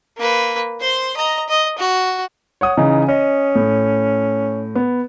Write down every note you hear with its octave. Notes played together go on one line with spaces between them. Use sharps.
A#3 B4
C5 C6
D#5 A#5
D#5
F#4
C#5 F#5 D#6
C#3 E3 D#4 G#4
C#4 D#5
A2
B3